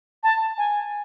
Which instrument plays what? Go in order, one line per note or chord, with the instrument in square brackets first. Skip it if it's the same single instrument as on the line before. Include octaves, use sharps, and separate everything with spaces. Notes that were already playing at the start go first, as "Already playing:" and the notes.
[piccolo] A5
G#5